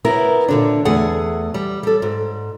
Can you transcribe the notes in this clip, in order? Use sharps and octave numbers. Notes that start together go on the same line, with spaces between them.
B3 E4 A#4
A#2 D3 D4
E2 A3 G#4 F#5
G3
G3 A4
G#2